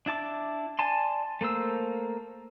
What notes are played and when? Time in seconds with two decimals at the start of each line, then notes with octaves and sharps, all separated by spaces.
0.06 D4 E4 A5 D6
0.79 D5 G#5 A5 C6
1.41 A3 A#3 C5 E6